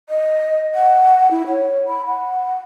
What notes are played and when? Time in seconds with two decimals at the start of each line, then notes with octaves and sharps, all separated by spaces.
0.09 D#5
0.75 F#5
1.31 E4
1.48 C#5
1.88 B5
2.07 F#5